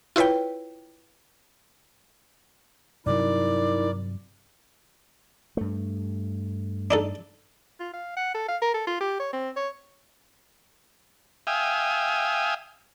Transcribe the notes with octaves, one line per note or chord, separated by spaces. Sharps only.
E4 F4 B4 C#5 G5
G2 C3 F#3 D#4 E4 A#4 D5
G2 A3
D4 D#4 A4
F4
F5
F#5
A4
F5
A#4
A4
F4
G4
C#5
C4
C#5
E5 F5 G5 G#5 D#6